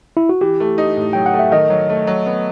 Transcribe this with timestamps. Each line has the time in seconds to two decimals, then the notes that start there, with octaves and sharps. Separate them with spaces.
0.17 E4
0.29 F#4
0.41 E3 G4
0.60 A3
0.78 D#4
0.97 A2
1.13 F#3 G5
1.26 F#5
1.34 A3
1.39 E5
1.52 D#3 D#5
1.70 F#3
1.90 A3
2.07 F#3
2.26 B3